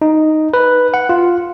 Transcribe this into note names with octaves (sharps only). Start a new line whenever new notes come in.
D#4
B4
F#5
F4